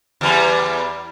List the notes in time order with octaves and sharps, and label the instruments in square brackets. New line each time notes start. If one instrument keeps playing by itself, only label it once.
[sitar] E2 G3